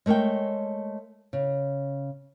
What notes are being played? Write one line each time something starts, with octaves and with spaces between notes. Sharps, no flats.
G#3 A3 A#4 C#5 G5
C#3